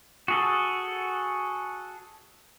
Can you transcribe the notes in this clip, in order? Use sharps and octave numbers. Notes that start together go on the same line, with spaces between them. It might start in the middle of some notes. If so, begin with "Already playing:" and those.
F#4 G#4 A4